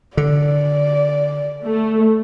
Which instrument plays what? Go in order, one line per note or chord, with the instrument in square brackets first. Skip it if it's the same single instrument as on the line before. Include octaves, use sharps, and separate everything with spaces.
[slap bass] D3 [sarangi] D5
[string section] A3